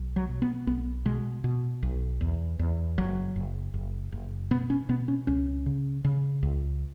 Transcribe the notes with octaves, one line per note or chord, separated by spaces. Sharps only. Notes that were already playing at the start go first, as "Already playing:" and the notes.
Already playing: B1
F#3
B2
B3
B1 B3
B2 G#3
B2
B1
E2
E2
F#1 F#3
F#1
F#1
F#1
B2 B3
C#4
B2 B3
C#4
C#2 C#4
C#3
C#3
C#2